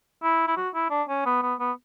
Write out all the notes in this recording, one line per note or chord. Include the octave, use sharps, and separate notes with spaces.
E4
E4
F#4
E4
D4
C#4
B3
B3
B3